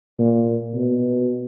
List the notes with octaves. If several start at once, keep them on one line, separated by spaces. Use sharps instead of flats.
A#2
B2